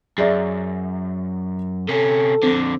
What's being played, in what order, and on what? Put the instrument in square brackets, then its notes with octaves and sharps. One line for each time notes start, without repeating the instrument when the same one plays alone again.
[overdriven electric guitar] F#2 [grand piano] G#4 D5 E5
[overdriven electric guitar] C3 C#4 [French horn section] A4
[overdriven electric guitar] F2 D3 [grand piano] C4